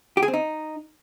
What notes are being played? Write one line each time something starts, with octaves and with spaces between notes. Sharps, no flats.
G4
G#4
C4
D#4